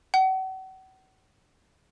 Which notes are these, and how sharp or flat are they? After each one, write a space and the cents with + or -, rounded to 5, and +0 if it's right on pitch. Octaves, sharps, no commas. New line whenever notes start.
F#5 +40